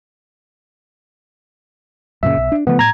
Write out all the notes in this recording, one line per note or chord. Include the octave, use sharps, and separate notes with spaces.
F#2 A#2 C#3 E5
B1
D4
C#3 F3 A3 B3
A2 A#5 G#6